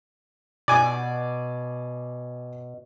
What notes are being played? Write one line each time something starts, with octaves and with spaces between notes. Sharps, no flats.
B2 D5 G#5 D6